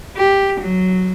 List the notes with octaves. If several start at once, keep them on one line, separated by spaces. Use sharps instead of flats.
G4
F#3